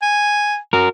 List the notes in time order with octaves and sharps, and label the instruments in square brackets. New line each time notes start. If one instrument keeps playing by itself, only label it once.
[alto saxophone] G#5
[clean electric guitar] F#4 A#4